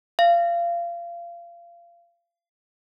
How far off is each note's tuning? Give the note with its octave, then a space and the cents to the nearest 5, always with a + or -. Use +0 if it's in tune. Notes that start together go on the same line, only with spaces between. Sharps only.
F5 -25